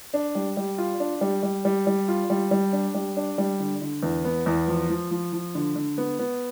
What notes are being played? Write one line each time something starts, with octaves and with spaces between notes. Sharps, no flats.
D4
G3
G3
F4
D4
G3
G3
G3
G3
F4
G3
G3
D4
G3
D4
G3
D3
D3
E2
B3
E2
F3
F3
F3
F3
D3
D3
B3
B3